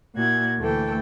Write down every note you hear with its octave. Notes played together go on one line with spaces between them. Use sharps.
A#2 E4 F#4 G#6
D2 E3 A3 A4 G5